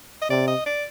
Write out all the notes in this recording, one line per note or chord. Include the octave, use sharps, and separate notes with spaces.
D#5
C3 D5
D#5
D5